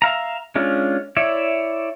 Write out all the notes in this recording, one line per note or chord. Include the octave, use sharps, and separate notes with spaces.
E5 F5 A#5
G#3 C#4 D4 F4
E4 C#5 D5 E5